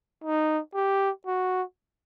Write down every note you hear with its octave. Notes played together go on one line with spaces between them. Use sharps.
D#4
G4
F#4